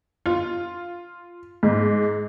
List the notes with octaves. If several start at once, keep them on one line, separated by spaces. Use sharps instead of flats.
F4
G#2